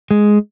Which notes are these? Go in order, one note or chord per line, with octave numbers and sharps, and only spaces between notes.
G#3